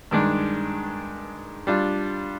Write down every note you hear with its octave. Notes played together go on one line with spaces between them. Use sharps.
G2 D#3 G#3 D4
G3 D4 F4